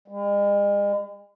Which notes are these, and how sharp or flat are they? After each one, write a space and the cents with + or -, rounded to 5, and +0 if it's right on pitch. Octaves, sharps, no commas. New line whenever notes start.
G#3 -45